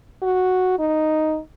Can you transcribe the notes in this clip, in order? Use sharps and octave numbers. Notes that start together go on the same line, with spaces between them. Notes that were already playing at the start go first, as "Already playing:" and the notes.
F#4
D#4